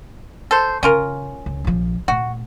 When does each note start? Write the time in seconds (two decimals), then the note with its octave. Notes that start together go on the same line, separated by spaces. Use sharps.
0.51 A4 C5
0.83 C#3 C#4 F4 A#4
1.46 C#2
1.64 A#1 F3
2.08 A#2 A3 F#4